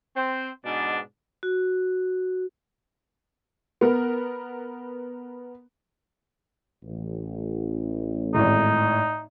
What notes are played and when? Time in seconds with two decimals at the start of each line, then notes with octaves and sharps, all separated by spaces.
0.16 C4 C5
0.65 G#2 B2 D4
1.43 F#4
3.81 B3 A#4
6.84 A1
8.35 G#1 A2 D#4